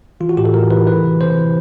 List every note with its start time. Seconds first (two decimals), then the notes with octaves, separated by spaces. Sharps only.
0.20 E3 F4
0.29 F#4
0.37 A2 G4
0.45 A4
0.54 A2 A#4
0.70 E3 B4
0.87 E3 B4
1.03 C3
1.21 C3 C5
1.37 E3